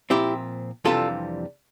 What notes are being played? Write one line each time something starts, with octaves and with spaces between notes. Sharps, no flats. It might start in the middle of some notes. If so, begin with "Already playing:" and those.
A#2 F3 C4 E4 G4
F2 C3 E3 G3 D4 F4 A4